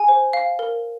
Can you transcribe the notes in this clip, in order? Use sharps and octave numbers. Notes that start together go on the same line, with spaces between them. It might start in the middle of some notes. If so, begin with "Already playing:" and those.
Already playing: G#4 G#5
C5
F5
A#4